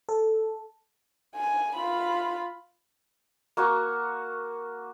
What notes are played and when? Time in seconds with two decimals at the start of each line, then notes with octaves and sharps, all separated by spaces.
0.09 A4
1.36 G#5
1.76 F4 B5
3.57 A#3 F#4 C#6